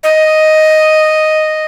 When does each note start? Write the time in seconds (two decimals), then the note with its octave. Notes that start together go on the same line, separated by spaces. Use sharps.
0.03 D#5